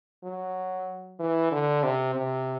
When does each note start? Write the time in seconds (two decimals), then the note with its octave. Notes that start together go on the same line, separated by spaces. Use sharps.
0.24 F#3
1.19 E3
1.52 D3
1.83 C3
2.15 C3